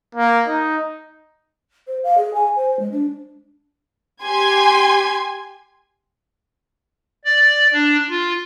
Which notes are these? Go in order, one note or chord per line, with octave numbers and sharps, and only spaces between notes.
A#3
D#4
C5
F5
G#4
G#5
C5
G#3
D4
G4 G#5 C6 G#6
D5
D4
F4